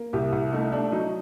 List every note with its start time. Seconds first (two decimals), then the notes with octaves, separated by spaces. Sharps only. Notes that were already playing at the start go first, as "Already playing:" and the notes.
Already playing: A#3
0.13 C2 G4
0.33 C2
0.52 A3 D#4
0.72 A3 D4
0.92 F#3 D#4